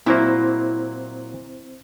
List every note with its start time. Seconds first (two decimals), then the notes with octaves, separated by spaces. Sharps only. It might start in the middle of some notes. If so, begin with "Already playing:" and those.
0.06 A#2 F#3 A#3 C4 E4 C5